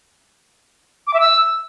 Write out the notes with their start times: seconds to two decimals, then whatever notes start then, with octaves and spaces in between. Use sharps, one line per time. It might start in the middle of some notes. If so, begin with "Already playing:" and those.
1.07 D6
1.14 E5
1.20 E6